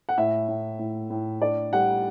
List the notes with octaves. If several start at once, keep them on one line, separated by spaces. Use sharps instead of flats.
F#5
A2 E5
A2
A2
A2
D4 D5
G3 F#5